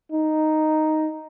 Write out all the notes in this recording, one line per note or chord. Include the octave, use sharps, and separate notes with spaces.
D#4